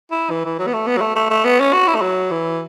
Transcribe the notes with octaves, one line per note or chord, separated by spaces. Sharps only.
E4
E3
E3
F#3
B3
A3
B3
F#3
A3
A3
A3
B3
C#4
F#4
E4
A3
F#3
E3